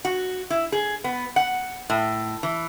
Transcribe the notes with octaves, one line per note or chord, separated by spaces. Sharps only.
F#4
E4
G#4
B3
F#5
A2
E3